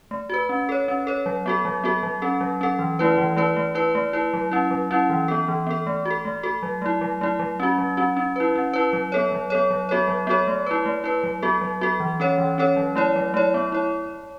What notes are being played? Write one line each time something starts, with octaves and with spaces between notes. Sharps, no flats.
A3
F#4 B4
C#4
A4 C#5
C#4
A4 C#5
F#3
B3 F#4 A4
F#3
B3 F#4 A4
F#3
C#4 A4
F#3
C#4 A4
E3
A3 E4 B4
E3
A3 E4 B4
A3
E4 B4
A3
E4 B4
F#3
C#4 E4
F#3
C#4 E4
E3
B3 A4
E3
B3 A4
A3
F#4
A4
A3
F#4 A4
F#3
A3 E4
F#3
A3 E4
F#3
C#4 F#4
F#3
C#4 F#4
C#4
E4 B4
C#4
E4 B4
F#3
B3 A4 C#5
F#3
B3 A4 C#5
F#3
B3 F#4 A4 C#5
F#3
B3 F#4 A4 C#5
A3
E4 B4
A3
E4 B4
F#3
B3 F#4 A4
F#3
B3 F#4 A4
E3
C#4 A4 C#5
E3
C#4 A4 C#5
F#3
A3 E4 C#5
F#3
A3 E4 C#5
B3
E4 C#5